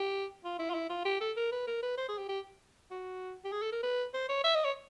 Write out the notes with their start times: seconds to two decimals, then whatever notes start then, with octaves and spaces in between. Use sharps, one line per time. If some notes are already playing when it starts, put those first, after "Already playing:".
Already playing: G4
0.44 F4
0.59 E4
0.70 F4
0.75 E4
0.90 F4
1.05 G4
1.21 A4
1.37 A#4
1.52 B4
1.67 A#4
1.83 B4
1.98 C5
2.08 G#4
2.18 G4
2.29 G4
2.91 F#4
3.44 G4
3.52 G#4
3.62 A4
3.72 A#4
3.83 B4
4.14 C5
4.29 C#5
4.44 E5
4.55 D#5
4.65 C#5